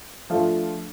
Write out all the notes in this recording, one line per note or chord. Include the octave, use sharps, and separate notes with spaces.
F3 A3 D4 F4